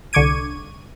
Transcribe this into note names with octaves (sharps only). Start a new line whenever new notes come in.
C2 D3 C#6 D6 G#6 D#7